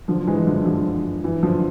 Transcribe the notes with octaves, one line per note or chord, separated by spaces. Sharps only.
D3 F3
E3 G#3
D3 F3
D3 F3
E3
D3 F3